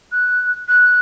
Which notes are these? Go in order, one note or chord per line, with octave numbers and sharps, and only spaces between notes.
F#6
F#6